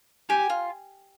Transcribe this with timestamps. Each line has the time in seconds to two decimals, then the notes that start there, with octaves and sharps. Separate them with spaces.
0.29 G4 G#5
0.50 F4